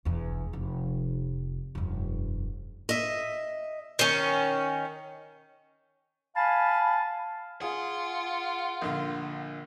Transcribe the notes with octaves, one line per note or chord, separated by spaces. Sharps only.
E1 E2
F1
E1 F#2
D#5 E5
D#3 C#4
F5 G#5 A5 B5
F4 G#4 F#5
A#1 D3 F5